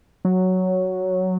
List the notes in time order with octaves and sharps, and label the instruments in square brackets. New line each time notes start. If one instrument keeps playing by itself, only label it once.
[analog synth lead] F#3